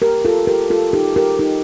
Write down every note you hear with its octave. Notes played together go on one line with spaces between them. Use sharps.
G4 A#4
F4 A4
G4 A#4
F4 A4
D#4 G4
G4 A#4
D#4 G4